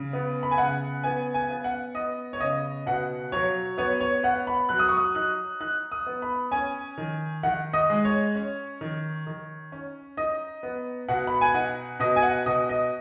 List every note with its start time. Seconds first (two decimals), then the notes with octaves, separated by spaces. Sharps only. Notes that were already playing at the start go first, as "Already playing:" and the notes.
Already playing: C#3
0.13 B3
0.43 B5
0.51 G#5
0.58 C#3 F#5
1.04 B3 G#5
1.34 G#5
1.50 B3
1.64 F#5
1.95 B3 D#5
2.33 C#5
2.40 C#3 D#5
2.86 B2 F#5
3.32 F#3 C#5
3.78 B3 C#5
4.01 C#5
4.23 B3 F#5
4.47 B5
4.69 F#3 F#6
4.79 D#6
4.88 C#6
4.97 D#6
5.15 D#4 F#6
5.60 D#4 F#6
5.92 D#6
6.06 B3
6.22 B5
6.52 C#4 G#5
6.98 D#3
7.43 D#3 F#5
7.73 D#5
7.90 G#3
8.05 C#5
8.35 C#4
8.81 D#3
9.27 D#3
9.72 C#4
10.17 D#4 D#5
10.63 B3
11.09 B2 F#5
11.27 B5
11.41 G#5
11.54 D#4 F#5
12.00 B2 D#5
12.16 G#5
12.23 F#5
12.46 B2 D#5
12.69 D#5